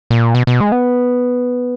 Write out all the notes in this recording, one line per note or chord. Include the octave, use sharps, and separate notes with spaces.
A#2
B2
B2
G#3
B3